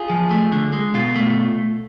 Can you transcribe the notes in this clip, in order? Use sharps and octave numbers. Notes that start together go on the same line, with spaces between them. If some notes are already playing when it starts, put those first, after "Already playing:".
Already playing: F4 G#4
F3
A3
D3
G#3
B2 F4
A3